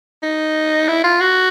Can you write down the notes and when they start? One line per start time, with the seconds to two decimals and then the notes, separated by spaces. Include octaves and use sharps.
0.23 D#4
0.88 E4
1.04 F4
1.20 F#4